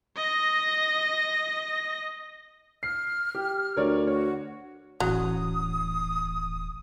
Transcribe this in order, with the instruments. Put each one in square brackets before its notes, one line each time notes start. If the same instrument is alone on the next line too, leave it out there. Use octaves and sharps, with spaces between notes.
[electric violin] D#5 A#6
[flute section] F6 [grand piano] C7
[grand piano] G4
[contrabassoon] D2 [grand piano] A#4 C#5 D5
[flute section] F#4 [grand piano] C#5
[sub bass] D#1 [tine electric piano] A1 [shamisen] F#3 [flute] D#6